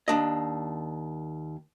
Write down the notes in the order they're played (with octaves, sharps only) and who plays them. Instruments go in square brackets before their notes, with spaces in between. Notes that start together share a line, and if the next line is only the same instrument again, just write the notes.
[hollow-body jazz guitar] D#2 D4 D#5